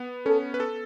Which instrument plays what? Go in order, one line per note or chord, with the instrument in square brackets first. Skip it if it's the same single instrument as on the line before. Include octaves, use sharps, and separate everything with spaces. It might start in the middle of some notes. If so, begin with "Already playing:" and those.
Already playing: [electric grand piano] B3
[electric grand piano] C#4 [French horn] A4
[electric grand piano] B4
A4